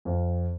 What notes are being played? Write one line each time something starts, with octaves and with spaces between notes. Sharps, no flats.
F2